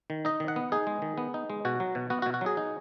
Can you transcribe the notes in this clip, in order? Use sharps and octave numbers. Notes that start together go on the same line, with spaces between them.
D#3
D#4 D#5
D#3
F#5
B3
D#4 G#4
G#3
D#3
B3
D#4
G#3
B2 F#4
F#3
B2
B3 F#4
F#4
B2
F#4
F#3
G#4
D#4